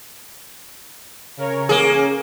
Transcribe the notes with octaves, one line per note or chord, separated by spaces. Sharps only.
C#3 A#4 C#5
A#3 C#4 G#4